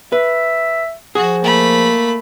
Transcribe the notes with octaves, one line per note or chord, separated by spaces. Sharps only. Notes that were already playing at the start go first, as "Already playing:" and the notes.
B4 E5
F3 F#4 G#4
A3 A#3 B5